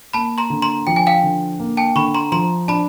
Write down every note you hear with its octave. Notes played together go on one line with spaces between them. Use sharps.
A#3 A5 B5
A#5 C6
D3
A#5 C6
F3 G5
G#5
F5 G5
D3
A#3
G5 A5
D3 B5 C#6
A#5 C6
F3 A#5 C6
D4 A5 B5